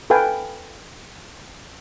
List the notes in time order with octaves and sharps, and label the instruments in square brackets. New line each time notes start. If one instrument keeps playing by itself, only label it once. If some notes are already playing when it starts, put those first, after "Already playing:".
[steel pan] A4 B4 F5 G5 G#5